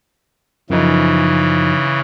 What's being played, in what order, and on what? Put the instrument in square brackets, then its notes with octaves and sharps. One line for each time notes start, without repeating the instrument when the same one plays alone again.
[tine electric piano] F#2 F3 D#4 [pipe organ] C#3 E3